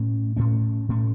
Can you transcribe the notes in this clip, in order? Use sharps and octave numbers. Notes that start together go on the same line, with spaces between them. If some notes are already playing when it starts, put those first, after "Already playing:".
Already playing: A2 A3 C#4
A2 A3 C#4
A2 A3 C#4